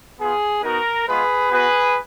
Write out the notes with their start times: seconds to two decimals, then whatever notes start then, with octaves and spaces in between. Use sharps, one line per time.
0.19 B3 F4 G#4
0.63 B3 D#4 F#4 A#4
1.07 G#3 B3 F4 G#4 B4
1.51 B3 F#4 G#4 B4